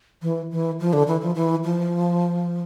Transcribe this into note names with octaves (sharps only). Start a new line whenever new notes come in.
E3
E3
F3
D3
E3
F3
E3
F3